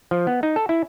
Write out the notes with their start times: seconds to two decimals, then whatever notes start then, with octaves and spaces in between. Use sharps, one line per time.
0.11 F3
0.27 B3
0.43 D#4
0.56 A4
0.69 E4